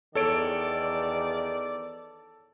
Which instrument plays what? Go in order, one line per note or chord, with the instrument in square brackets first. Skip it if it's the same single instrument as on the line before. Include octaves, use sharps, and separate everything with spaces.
[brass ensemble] E2 D#3 D5 [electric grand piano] A4 C#5 D7